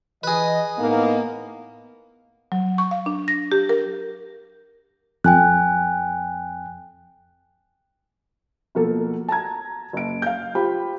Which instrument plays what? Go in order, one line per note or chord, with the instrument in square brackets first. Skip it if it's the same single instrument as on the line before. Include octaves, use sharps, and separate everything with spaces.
[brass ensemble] E3 D#5 [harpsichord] G#4 B4
[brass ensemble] A2 D#4 D#5 [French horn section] A#3 B3
[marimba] F#3
C#6
F5
D4
A#6
G4
A#4
[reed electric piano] F2 [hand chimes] G5 G#5 F#6
[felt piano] B2 F3 A#3 A4
A5 A#5 G#6
F#1 D7
F5 G6
F4 G4 C5 B5